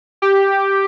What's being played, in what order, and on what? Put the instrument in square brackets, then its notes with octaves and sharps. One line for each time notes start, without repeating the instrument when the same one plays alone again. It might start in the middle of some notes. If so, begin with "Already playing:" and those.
[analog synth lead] G4